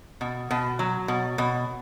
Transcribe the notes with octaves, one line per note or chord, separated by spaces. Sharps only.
B2
B2
F#3
B2
B2